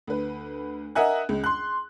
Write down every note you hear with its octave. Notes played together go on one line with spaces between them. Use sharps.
D2 B4
A#4 D#5 E5 F#5 G#5 F#6
C#2
C6 F#6